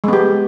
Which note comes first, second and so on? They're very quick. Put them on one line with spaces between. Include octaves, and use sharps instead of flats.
G#3 B3 G4